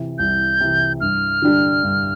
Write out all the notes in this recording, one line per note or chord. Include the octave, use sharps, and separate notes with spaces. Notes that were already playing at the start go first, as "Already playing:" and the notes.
Already playing: C3 E3
C2 G6
C3 E3
G2 F6
D3 G3 D4 G4
G2